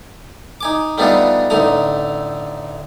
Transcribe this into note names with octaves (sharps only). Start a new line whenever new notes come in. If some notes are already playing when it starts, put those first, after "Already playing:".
D#4 G#5 D6
G3 A3 B3 D4 D#4 F4
A1 D3 A3 D#4 A#5